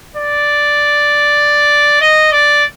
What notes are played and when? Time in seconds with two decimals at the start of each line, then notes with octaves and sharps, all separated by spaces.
0.17 D5
2.01 D#5
2.32 D5